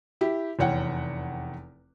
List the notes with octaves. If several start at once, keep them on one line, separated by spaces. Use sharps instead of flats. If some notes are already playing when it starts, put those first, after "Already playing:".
E4 G4
F1 E2 C#5 F#5 G5